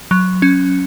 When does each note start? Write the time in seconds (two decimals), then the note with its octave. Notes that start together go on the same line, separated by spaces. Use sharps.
0.11 F#3
0.42 C#4